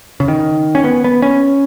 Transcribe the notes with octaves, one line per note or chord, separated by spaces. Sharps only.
C#3
D#3
C#4
B3
B3
C#4